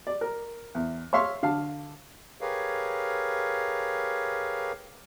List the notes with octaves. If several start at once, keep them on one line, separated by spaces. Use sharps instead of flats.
D5
A#4
E2
C#5 E5 F5 C6 C#6
D3 F5 A5
G4 G#4 A#4 B4 C#5 F5